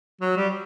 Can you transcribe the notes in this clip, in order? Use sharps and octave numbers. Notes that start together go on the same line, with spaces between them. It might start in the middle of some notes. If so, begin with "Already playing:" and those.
F#3
G3